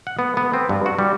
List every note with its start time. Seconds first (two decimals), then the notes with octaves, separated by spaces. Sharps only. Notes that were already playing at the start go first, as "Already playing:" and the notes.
0.07 F#5
0.19 B3
0.37 B3
0.54 C4
0.69 G2
0.86 F#4
0.99 G3